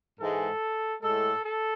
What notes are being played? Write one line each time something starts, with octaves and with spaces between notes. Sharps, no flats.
G#2 E3 G#3 A4
A2 G#3 A4
A4